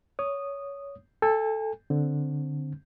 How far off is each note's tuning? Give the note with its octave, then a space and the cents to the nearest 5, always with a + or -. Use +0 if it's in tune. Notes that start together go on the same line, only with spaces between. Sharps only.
C#5 +15 D#6 -10
A4 +0 G#5 -40
D3 +0 C4 +0